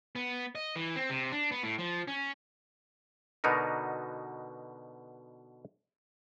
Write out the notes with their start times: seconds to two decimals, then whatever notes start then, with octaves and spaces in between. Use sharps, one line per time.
0.16 B3
0.55 D#5
0.75 E3
0.96 C4
1.10 C3
1.32 D4
1.52 B3
1.63 A2
1.78 F3
2.08 C#4
3.44 B2 D3 B3 D#4 F#4 A#4